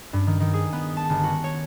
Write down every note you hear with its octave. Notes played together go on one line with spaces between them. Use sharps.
G2
D#3
D#3
G#4
B3
A5
G1
F#4
C#5